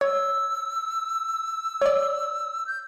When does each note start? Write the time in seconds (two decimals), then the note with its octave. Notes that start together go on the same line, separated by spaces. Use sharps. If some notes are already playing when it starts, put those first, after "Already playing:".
0.01 C#5 E6
1.82 C#5 D5
2.66 G6